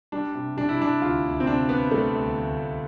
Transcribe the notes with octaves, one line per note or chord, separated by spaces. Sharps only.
G3 D4
C3
G3 D4
E4
G3 D4
D2 F4
D2
C4
C3 D4
G3 B3
G3 A3
D2
D2
D2